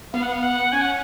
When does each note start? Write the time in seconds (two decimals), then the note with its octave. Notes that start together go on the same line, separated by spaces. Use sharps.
0.13 B3 F5
0.22 F#5
0.28 B3 F5
0.43 F#5
0.72 C#4 G#5
0.81 F#5